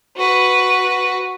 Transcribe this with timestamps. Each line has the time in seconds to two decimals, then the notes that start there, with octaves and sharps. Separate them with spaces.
0.17 F#4 B4